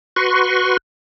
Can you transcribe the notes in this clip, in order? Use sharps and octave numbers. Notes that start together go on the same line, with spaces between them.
F#4 B4 C6 C#6